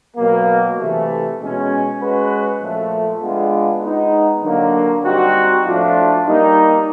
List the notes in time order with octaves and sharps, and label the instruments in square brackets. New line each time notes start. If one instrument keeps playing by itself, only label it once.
[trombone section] B2 F#3 A#3
C3 E3 A3
B2 G#3 C#4
G#3 C#4 F#4 B4
A#2 F3 A3
G#3 B3 D4 F4
G#3 B3 D#4
D3 F#3 A#3
G3 C4 D#4 F#4
A2 F3 A3 D4 F4
G3 A#3 D#4